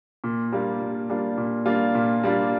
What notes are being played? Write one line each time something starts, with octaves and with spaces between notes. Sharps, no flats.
A#2
G3 A#3 D4 F4
A#2
G3 A#3 D4 F4
A#2
G3 A#3 D4 F4
A#2
G3 A#3 D4 F4